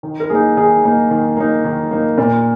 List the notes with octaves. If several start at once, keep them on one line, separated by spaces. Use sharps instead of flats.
D#3
A#4
A#3 D#4 G#4
D#3 G#4
A#3 D#4
D#3
A#3 D#4
D#3
A#3 D#4
A#2 A#4